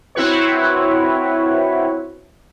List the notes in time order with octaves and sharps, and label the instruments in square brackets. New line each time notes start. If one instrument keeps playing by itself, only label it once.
[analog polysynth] C4 E4 F#4 B4 C#5